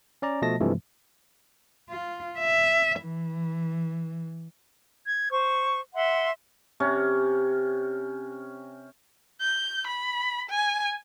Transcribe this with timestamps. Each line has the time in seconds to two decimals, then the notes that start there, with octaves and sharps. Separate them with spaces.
0.22 C#4 D5 A#5
0.42 B2 F3 A3 D#5 A5 A#6
0.60 G2 C3 E3 F3 G#3 A3
1.89 F4
2.39 E5
3.02 E3
5.06 G#6
5.30 C5 C#6
5.94 E5 F#5 C6
6.80 C3 C#4
9.41 G6
9.87 B5
10.50 G#5